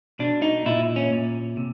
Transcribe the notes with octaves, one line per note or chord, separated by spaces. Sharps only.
B2 D4
D#4
A#2 E4
C#4
A#2
C3